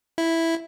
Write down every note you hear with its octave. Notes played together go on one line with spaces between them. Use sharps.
E4